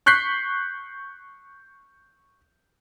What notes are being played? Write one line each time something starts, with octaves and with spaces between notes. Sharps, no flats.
C#6 F#6 G6 B6 C7